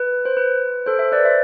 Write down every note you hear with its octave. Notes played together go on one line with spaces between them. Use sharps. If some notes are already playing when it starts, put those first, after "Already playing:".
Already playing: B4
C5
B4
A4 C5
C5 E5
B4 D5
C5 E5